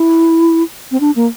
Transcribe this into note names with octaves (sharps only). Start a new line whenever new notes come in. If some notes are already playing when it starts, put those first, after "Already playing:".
Already playing: E4
C4
D4
A#3